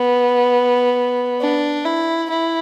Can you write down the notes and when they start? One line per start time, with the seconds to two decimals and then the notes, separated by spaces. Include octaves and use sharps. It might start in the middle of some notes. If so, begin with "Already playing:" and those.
Already playing: B3
1.41 D4
1.85 E4
2.30 E4